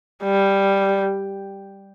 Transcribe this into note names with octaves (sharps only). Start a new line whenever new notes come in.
G3